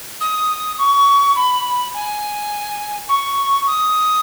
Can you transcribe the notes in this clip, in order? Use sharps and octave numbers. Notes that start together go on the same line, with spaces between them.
D#6
C#6
B5
G#5
C#6
D#6